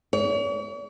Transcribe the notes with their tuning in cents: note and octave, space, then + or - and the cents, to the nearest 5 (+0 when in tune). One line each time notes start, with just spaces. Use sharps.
C#5 +45